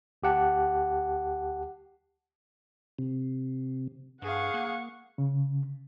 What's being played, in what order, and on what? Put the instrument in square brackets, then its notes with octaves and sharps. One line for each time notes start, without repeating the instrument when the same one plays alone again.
[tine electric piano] D2 G4 F#5 A5
[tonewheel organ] C3
[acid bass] G2 [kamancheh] G#4 F5 [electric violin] F#5 C#6
[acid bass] A#3
[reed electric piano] C#3